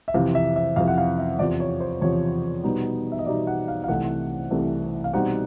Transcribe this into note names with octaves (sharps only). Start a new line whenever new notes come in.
E5
F2 C3 E3 F5
E5
E5
F2 C3 E3 F5
F#5
F5
E5
E2 C3 F3 D5
C#5
C5
E2 C3 F3 C#5
B2 G3 B3 D#4
E5
D#5
B2 G3 B3 D#4 D5
F#5
F5
F5
C2 C3 E3 A3 F#5
C2 C3 E3 A3
F5
B2 G3 C4 D#4 F#5